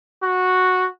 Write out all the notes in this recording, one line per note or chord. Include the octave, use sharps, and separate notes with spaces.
F#4